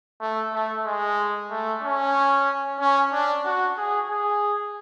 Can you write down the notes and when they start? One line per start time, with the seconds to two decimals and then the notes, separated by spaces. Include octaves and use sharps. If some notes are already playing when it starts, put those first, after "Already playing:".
0.20 A3
0.53 A3
0.85 G#3
1.51 A3
1.83 C#4
2.80 C#4
3.12 D4
3.44 F#4
3.77 G#4
4.10 G#4